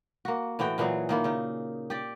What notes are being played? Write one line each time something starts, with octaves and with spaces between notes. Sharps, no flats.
A#3 F#4
A2 E3 F#4 G5
A#2 E3 F#3 G#4
D#3 A#3 E4
C#3 D#4
G4 D5